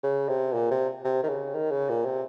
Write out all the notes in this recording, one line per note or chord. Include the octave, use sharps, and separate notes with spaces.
C#3
C3
A#2
C3
C3
D#3
C#3
D#3
C#3
A#2
C3